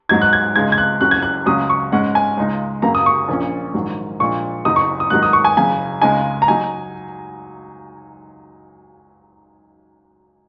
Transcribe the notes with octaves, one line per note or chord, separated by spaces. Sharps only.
G#2 F#3 D#4 G#6
F#6
G#6
C#2 C#3 G#3 D#4 G#6
G#6
F#6
F#1 F#2 F#3 C#4 F#6
G#6
F#6
C#2 C#3 F#3 C#4 D#6
C#6
G#2 G#3 C#4 F#5
G#5
C#2 C#3 G#3 D#4
F#2 C#3 F#3 A#3 A#5
D#6
C#6
A#1 A#2 A#3 C#4
A#1 G#2 D#3 F#3
A#1 A#2 G#3 C#6
F#1 F#2 F#3 D#4 D#6
C#6
D#6
G#2 D#3 F#3 D#4 F#6
D#6
C#6
G#5
F#1 F#2 C#3 G#5
C#2 C#3 G#3 D#4 G#5
A#5
F#3 D#4 G#5